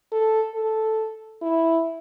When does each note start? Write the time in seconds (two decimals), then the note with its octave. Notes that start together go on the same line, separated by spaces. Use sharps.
0.12 A4
0.54 A4
1.42 E4